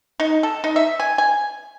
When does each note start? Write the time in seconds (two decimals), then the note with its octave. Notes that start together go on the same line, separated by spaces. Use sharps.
0.20 D#4
0.43 A4
0.64 D#4
0.76 E5
1.00 G#5
1.18 G#5